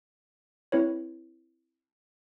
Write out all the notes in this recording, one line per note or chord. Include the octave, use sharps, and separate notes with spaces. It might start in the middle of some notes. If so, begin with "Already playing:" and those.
C4 E4 B4 C#5